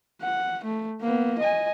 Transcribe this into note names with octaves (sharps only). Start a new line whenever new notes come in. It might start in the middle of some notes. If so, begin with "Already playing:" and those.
F#5
A3
A#3 B3
D#5 G#5